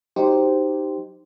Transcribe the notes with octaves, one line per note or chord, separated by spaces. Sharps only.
F#3 D#4 G4 C5